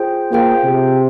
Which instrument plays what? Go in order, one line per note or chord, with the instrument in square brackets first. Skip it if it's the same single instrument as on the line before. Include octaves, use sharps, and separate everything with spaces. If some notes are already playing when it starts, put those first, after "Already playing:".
Already playing: [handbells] F4 G#4 C5 G5
[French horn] A#3 [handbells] F4 G#4 C5 G5
[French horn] C3